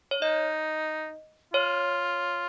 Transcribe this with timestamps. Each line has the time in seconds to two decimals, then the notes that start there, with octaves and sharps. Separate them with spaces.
0.11 C#5
0.22 D#4 D#5
1.53 F4 C#5